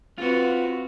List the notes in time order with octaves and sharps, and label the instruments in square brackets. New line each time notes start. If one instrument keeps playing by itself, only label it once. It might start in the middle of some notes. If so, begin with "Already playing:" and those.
[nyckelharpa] C4 B4 [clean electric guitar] F4 F#4